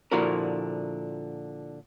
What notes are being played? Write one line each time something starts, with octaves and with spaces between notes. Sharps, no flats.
A#2 D3 F3 E4 F#4 A#4